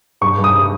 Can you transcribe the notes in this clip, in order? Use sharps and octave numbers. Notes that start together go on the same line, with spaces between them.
G2 C#6
G2
D#6